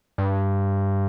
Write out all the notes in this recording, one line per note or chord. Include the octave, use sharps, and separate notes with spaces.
G2